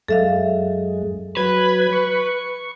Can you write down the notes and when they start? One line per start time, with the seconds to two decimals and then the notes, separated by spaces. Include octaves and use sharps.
0.08 F#2 G#3 A4 E5 F5
1.37 F#3 B4 G#6
1.93 C#6